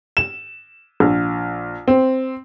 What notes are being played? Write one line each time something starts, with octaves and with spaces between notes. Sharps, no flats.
E7
A#1
C4